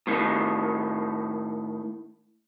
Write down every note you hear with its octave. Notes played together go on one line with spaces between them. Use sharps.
A2 D#3